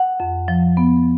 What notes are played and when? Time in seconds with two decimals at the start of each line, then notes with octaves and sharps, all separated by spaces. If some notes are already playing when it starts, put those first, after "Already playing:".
Already playing: F#5
0.20 F2
0.48 F3
0.77 B3